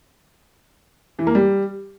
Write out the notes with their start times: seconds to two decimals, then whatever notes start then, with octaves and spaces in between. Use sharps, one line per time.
1.19 E3
1.27 A#3
1.35 G3